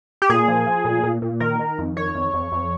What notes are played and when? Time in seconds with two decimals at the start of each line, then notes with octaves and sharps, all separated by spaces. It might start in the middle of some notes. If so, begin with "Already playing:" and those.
0.22 G4
0.29 A#2 G#4
0.48 F3
0.66 F3
0.85 A#2
1.03 A#2
1.22 A#2
1.40 D#3 A#4
1.59 D#3
1.78 F2
1.97 D#3 C#5
2.15 F2
2.34 F2
2.52 F2